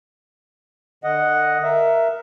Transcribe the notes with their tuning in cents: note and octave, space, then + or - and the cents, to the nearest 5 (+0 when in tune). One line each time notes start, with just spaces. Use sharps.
D3 +30 D#5 +0 F#5 +0
A#4 +0 E5 +15